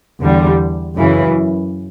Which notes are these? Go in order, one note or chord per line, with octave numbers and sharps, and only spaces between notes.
E2 D3 G3
F#2 C#3 E3